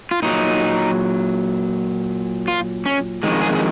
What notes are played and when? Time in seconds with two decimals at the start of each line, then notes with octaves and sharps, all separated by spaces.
0.11 F4
0.22 A#2 F#3 D#4
2.48 F4
2.86 C#4
3.23 F2 D#3 G#3
3.42 G#4
3.55 G#4